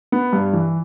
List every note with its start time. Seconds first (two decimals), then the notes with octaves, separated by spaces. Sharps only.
0.12 B3
0.33 G2
0.53 E3